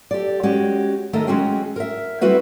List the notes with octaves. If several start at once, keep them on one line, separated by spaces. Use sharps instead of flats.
G4 A4 D5
G#3 C#4 F#4 G4
D#3 A3 A4 A#4 D#5 E5
G#3 C#4 F#4 G#4 G5
A#4 E5
G3 C4 E4 F#4 B4 E5